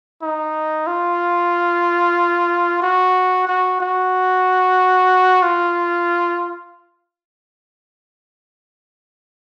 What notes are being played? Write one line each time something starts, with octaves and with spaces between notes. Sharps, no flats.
D#4
F4
F#4
F#4
F#4
F4